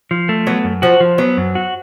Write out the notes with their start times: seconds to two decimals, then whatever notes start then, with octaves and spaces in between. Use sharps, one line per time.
0.11 F3
0.29 A3
0.47 F#3 B3
0.64 F#2
0.82 F3 F#4
1.00 F3
1.18 F#3 B3
1.37 F#2
1.55 F#4